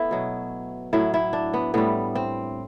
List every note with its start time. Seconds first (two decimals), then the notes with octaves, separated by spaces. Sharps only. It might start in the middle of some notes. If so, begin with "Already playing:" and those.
Already playing: A3 B3 E4
0.11 B2 F#3
0.93 A2 F#3 E4
1.14 E4
1.33 D4
1.54 B3
1.74 A2 G3 B3
2.15 C4